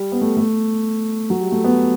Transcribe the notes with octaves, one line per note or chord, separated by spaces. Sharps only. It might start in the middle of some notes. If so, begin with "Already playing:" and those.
Already playing: G3
B3
A3
A3
F#3
G3
A3
B3